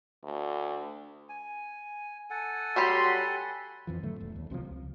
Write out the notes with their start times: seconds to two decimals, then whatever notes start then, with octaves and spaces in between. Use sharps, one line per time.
0.23 D2
1.29 G#5
2.30 A4 F#5 G#5
2.76 F#3 G3 F#4 G4 B5 C6
3.87 F2 E3 F3
4.03 G#2 D3 F#3 A3
4.20 E1
4.36 D#2
4.50 B1 C3 E3 F3
4.65 C#2